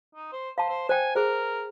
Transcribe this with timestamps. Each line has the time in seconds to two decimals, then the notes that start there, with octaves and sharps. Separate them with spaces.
0.15 D#4
0.33 C5
0.58 C5 F5 A5
0.69 C5
0.89 C5 G5 G#5
1.15 G#4 A#4 C5